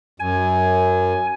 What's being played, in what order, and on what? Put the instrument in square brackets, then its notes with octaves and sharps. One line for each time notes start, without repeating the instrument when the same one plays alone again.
[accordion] F#2 [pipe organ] G#5